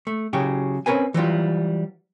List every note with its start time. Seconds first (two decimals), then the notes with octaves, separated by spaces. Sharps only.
0.07 A3
0.33 C#3 F#3 F#4 G4
0.86 C4 C#4 A#4 B4 G#5
1.14 E3 F#3 G3 F4